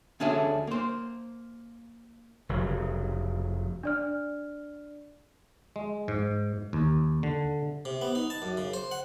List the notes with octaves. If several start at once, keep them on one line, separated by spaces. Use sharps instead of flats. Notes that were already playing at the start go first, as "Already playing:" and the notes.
D2 C#4 D4 G#4 A4 E5
A#3 C5
F1 C#3 F#3
D4 D5 F6
G#3
G#2
D#2
D3
C3
B3
D#4
A5
F#2
C#3
C5
F#5